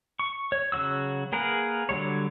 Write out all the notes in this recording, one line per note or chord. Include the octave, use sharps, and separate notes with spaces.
C#6
C#5
C#3 F#3 F#4 E6
A#3 G#4 A#4 B4 F#5
D3 F#3 G3 C#5